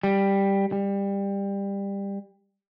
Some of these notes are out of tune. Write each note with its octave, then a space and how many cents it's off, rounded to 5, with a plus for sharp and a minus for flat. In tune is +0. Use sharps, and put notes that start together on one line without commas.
G3 +5
G3 +20